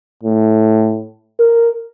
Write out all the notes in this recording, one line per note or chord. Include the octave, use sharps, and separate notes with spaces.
A2
A#4